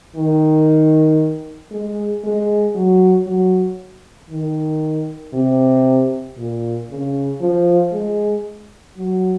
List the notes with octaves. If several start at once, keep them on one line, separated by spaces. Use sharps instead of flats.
D#3
G#3
G#3
F#3
F#3
D#3
C3
A#2
C#3
F3
G#3
F#3